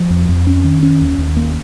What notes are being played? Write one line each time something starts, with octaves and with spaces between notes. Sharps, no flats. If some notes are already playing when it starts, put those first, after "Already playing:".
Already playing: F3
F2
F2
C#4
D#3
C#4
D#2
D#2
A#3